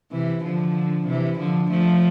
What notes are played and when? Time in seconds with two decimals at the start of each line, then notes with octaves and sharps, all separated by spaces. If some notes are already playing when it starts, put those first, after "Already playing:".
0.11 C3 E3
0.44 D3 F3
1.07 C3 E3
1.38 D3 F3
1.70 F3 A3